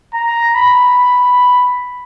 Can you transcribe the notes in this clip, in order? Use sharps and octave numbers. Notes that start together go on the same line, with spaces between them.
A#5
B5